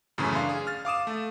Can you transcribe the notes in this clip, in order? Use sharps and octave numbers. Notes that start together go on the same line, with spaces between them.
F#2 A2 C#3 E3 A3 C#4
D4 F5 C6
G#4
F6 A6
F5 D6 D#6 E7
A3